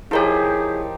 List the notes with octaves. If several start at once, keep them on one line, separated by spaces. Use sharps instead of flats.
F3 D#4 E4 G4 G#4 A#4 C#5